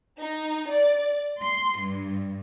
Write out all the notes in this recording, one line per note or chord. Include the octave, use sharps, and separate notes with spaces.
D#4
D5
C6
G2